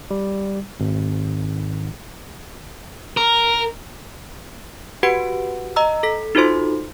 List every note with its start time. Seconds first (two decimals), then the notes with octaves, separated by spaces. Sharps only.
0.11 G3
0.80 G#1
3.17 A#4
5.03 F#4 G4 B4 F#5 D7
5.76 D#5 A#5 E6
6.03 A4 B6
6.35 D#4 F4 F#4 A4 C5 C6